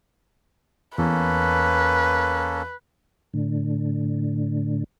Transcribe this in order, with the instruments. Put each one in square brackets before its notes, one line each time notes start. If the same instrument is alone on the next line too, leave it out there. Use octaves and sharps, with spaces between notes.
[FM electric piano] E2 [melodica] A#3 C#4 A4 [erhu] B4
[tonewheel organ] A2 D3